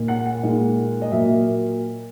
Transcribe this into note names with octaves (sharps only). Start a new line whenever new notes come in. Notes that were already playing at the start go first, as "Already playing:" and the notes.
Already playing: A#2 A#3 D#4
F#5
F#5
A#2 G#3 D#4
D#5
A#2 F#3 A#3 E5